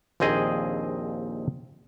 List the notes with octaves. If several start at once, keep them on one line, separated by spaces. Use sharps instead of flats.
A#1 D#2 C4 G#4 D#5